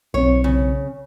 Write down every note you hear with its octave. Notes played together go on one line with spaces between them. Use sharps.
B1 C4 C#5
C#3